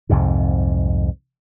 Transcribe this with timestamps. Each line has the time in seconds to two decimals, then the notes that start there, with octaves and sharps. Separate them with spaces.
0.09 C2 F2 G#2 C3